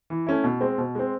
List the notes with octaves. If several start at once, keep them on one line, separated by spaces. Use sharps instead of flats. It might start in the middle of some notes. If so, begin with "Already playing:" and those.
E3
A3 C#4 E4
B2
G#3 C4
B2
G#3 C4